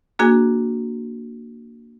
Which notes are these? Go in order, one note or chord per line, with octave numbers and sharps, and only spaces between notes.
A#3 D4 F#4 G#4 G#5